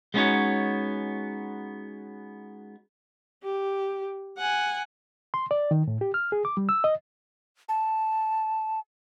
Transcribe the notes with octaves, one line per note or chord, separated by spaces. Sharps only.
G#3 B3 C#4 D#4 F#4 C#5
G4
F#5 G#5
C6
D5
D#3
A2
G4
F6
G#4
D6
G3
E6
D#5
A5